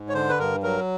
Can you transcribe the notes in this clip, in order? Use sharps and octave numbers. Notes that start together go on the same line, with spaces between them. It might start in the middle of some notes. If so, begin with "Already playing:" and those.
Already playing: G#2
C#5
D3 C5
B4
G2 A#4
F#3 A#4